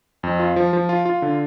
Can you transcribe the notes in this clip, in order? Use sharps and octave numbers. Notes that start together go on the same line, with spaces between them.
F2
F4
F3
F3
F4
F4
D3